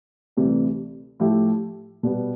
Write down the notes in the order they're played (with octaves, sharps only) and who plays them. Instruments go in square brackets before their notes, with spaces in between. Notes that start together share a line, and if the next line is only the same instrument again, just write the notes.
[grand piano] D2 C3 E3 G3
A2 F3 A3 E4 G4
B2 G3 B3